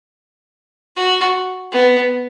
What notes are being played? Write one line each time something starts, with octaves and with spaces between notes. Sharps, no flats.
F#4
B3